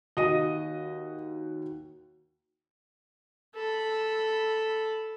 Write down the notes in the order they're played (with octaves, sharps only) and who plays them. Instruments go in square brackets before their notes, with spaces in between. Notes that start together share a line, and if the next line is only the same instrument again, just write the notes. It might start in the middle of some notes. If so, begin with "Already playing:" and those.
[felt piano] D#2 F#4 D#7 [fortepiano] D#5
[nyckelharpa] A4 B5